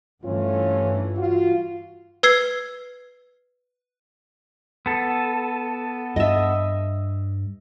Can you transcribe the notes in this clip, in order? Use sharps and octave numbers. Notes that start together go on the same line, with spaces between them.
G2 E3 A3 C#4 F4
F4 F#4
B4 E6 G#6 C7
B3 A4
G2 D#5 E5